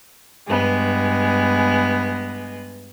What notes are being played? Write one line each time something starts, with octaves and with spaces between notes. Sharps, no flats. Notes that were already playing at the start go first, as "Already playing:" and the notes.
G2 G#3 B3